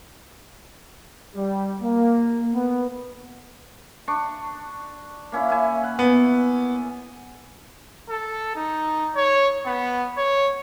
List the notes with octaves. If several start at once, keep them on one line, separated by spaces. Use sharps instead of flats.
G3
A#3
B3
D4 C#6
A#3 C#4 E4
A#3 E4 G#5
F#5
B3
A4
D#4
C#5
B3
C#5